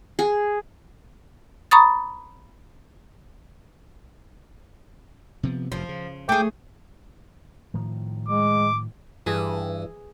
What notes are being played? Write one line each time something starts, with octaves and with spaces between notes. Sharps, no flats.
G#4
A#5 B5 C#6 D#6 A6
C3 F3 B3
F1 F#2 C3 F3
C#3
A3 G#4 G5 D6 G6
A2 D#3 F3
G#3 D6
G2 E3 G#4